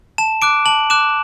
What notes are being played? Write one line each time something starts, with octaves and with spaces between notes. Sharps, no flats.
A5 E7
D6 F#6 D7
A5 F#7
D6 F#6 E7